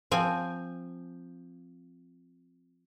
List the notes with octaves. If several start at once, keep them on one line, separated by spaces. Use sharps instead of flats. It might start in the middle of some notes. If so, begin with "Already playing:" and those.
F3 C4 G#5